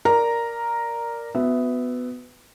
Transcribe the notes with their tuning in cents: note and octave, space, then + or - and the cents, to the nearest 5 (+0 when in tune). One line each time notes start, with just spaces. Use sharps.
A#4 +0 D5 +0 A#5 +0
B3 +15 F#4 -15 E5 +0